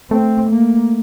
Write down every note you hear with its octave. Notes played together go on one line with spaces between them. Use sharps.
A3 C4
A#3